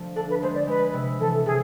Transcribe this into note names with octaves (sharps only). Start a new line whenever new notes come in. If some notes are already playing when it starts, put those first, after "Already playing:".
Already playing: D3 F3 A3
D4 A4
B4
G#3 C5
D5
G#3 B4
C3
E3 A4
C3 G#4